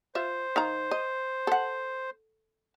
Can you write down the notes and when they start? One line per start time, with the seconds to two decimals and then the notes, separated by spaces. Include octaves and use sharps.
0.15 F4 C5 E5
0.56 D#3 F5 A#5
0.91 D#5
1.47 A4 F#5